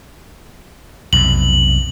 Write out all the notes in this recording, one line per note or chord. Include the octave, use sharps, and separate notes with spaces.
B1 F2 C3 F#7